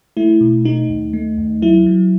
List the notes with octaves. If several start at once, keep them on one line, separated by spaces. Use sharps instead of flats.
A3 E4
B2
A3 D#4
D#2
A3
D#2
F#3 E4
F#3